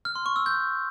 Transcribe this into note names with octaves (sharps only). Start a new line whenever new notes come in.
F6
C6
C#6
E6
G6